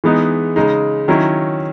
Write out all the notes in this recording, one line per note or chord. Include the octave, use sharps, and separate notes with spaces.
E3 G#3 B3 D#4
C#3 G#3 D#4
D#3 F#3 C#4 E4